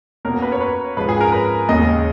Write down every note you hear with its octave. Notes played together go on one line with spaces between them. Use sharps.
B2 A#3 C#4 A#4
B4
C#5
B4
G#2 F3 G#3 C#4 B4
G#4
A#4
B4
D#2 C#3 G#3 C#4 D#5